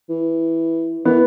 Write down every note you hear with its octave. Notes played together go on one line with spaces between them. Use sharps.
E3
E3 B3